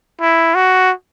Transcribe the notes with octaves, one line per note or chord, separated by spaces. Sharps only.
E4
F#4